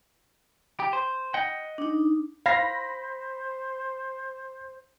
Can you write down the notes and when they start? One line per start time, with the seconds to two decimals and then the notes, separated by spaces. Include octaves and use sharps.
0.80 G4
0.93 C5
1.34 D#5 F#5 G5
1.78 D4 D#4
2.46 C5 F5 B5 A#6